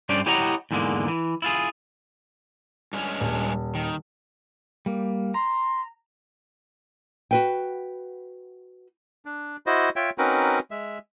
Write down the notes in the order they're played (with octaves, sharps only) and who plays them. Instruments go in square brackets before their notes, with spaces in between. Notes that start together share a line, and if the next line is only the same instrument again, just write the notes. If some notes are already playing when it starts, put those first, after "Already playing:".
[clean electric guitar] G2 C#4 D4 C5 D5
E4 G4 C#5 D#5 F#5 A#5
E2 G#2 D3 G#3 A#3
E3
E4 F4 G#4
[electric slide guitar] G2 G#3 C#4
[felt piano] D#1
[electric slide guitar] D#3
[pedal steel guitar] G3 A#3
[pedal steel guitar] A#5 [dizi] C6
[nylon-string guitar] F#4 B4 G5
[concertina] D4
E4 F#4 C5 D#5
F4 C#5 E5 G5
C4 C#4 D#4 F#4 A#4 B4
G#3 E5